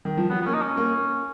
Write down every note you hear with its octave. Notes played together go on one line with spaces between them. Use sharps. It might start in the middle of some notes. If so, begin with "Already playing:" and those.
D#3
F3
F#3 B3
B3
A#3 C#4
D#4
C#4
A#3